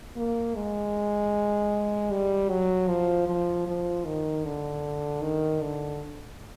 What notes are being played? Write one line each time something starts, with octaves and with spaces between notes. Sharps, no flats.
A#3
G#3
G3
F#3
F3
F3
F3
D#3
D3
D#3
D3